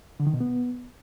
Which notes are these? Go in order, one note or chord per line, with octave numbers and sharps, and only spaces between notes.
D3
D#3
B2
B3